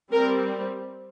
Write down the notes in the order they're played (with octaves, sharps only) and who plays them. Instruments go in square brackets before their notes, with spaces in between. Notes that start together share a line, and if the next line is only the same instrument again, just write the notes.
[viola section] G3 C4 A#4